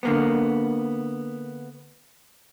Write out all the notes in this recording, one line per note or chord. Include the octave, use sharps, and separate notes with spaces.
D3 A#3 B3